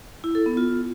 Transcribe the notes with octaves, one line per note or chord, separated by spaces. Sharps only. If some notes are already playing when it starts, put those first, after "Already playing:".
E4
A4
B3
F4